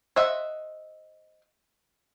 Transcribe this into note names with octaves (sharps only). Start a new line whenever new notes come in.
C5 D#5 E5 F#5